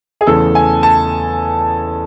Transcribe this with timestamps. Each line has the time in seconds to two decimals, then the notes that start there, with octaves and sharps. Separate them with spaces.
0.21 G#4
0.27 E2 C#3 E3 A3 A4
0.55 G#5
0.83 A5